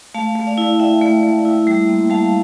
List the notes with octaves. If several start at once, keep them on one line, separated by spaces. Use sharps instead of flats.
A3 F5 A5
A3
D5 F5
E4
E4 E5 G5
A3
A3
E4
G3
A#3
G3 F5 A5